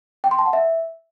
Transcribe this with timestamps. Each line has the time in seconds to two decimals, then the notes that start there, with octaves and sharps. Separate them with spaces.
0.24 G5
0.31 C6
0.39 A5
0.46 F#5
0.53 E5